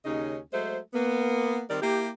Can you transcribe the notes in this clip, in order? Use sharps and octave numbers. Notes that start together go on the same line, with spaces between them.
D#2 C#3 C#4 D#4 D#5
F#3 G#3 A3 C5
A#3 B3
D#3 G3 C4 A#4 D5
A#3 E4 G4